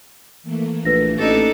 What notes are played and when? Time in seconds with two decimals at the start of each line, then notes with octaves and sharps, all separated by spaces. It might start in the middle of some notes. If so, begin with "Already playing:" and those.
0.43 E3 A3 A#3
0.85 A#1 B4 A#6
1.18 A1 D4 D#4 A4 A6